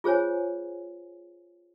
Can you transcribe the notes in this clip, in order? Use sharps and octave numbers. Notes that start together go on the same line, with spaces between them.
F4 G#4 C5 C#5 G#5